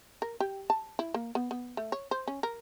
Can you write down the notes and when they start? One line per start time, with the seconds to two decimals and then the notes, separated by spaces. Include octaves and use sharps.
0.22 A#4
0.40 G4
0.70 A5
0.99 E4
1.14 A#3
1.35 B3
1.51 B3
1.77 A3
1.92 C#5
2.11 C5
2.28 C#4
2.43 A#4